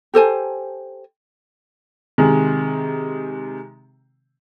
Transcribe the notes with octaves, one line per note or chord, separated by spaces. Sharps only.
G4 A4 C5 G#5
C3 D#3 G#3